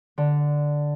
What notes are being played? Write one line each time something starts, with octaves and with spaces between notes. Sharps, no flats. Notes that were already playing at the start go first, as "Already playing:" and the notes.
D3